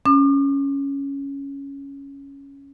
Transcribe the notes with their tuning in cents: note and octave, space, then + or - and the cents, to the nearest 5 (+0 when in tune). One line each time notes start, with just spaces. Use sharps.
C#4 +0 D6 +40